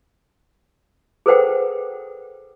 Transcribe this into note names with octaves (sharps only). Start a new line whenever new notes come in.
G#4 A4 B4 C5 F#5 G5